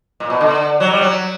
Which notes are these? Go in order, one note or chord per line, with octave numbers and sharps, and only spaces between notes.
A#2
B2
D3
F#3
G3
F#3